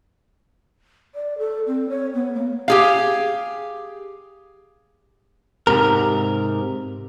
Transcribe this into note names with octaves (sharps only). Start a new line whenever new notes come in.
D5
A4
C4
C#5
B3
A#3
G4 G#4 F5
G#2 C3 A#4